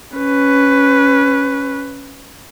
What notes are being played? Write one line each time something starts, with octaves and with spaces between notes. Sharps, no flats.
C#4 B4